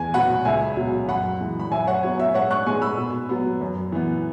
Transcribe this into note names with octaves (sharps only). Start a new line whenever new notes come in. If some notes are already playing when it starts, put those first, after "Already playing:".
Already playing: E2 G#5
B2 F#3 B3 F#5 B5
C#2 E5 G#5
B2 F#3
F#2 F#5 B5
E3 G#3
B5
F#2 E5 G#5
C#5 F#5
F#3 B3 C#5
E5
G#2 C#5 F#5
C#6 F#6
G#3 B3 G#5 C#6
B5 E6
B2
F#3 B3
F#2
E3 B3